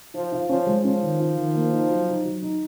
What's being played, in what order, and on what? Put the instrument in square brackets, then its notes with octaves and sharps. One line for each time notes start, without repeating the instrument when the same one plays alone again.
[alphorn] F3 [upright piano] F4
[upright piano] F4
[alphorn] F3 [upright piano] C#4
[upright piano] G#3
[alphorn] F3 [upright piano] C#4
[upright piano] D#3
F4
D#3
A#3
D#4
F#3
D#4
F#3
D#4